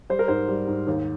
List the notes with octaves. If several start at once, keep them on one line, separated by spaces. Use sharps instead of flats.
G3 C5
A#4
G#2 C5
G3
G#2
D#2